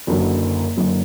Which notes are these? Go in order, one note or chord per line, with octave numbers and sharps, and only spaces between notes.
F#1 F#2 D3 F#3
F#1 F#2 D3 F#3